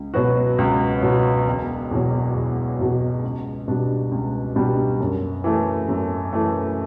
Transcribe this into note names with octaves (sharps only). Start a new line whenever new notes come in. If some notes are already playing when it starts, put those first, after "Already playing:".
Already playing: C#2
B2 F#3 B3 F#4
C#2
B2 F#3 B3 F#4
E1
E2 B2 F#3
E1
E2 B2 F#3
C#2
B2 G3 D4 G4
C#2
B2 G3 D4 G4
F#2
E3 A3
F#2
E3 A3